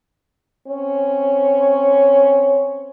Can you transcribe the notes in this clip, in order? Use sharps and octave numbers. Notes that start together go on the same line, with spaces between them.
C4 C#4 C#5